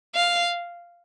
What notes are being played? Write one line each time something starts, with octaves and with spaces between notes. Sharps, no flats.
F5